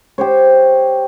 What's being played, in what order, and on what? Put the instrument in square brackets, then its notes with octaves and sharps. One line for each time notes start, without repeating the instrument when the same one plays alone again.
[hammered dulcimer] G4 C5 C#5